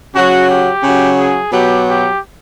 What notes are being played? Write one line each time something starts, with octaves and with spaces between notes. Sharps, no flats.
C#3 F#3 F#4
G4
C#3 F#3
G#4
B2 F#3 G4
G4